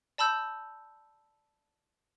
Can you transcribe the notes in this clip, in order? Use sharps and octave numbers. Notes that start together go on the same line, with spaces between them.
D5 A5 B5 E6 G6